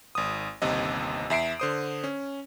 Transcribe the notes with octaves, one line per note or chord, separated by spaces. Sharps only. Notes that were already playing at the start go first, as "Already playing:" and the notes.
G#1 D#6
G1 D#2 C3 D#5
E2 E5 C7 D7
D3 C5 D#6
C#4